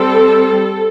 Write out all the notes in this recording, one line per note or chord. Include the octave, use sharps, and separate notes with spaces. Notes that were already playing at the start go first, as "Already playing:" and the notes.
Already playing: G3 C4 A4